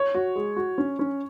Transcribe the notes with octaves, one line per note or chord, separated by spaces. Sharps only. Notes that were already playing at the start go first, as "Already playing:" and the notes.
Already playing: C#5
F#4
G#3
F#4
C#4
C#4